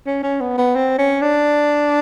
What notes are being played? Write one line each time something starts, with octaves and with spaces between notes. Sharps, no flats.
C#4
C#4
B3
B3
C4
C#4
D4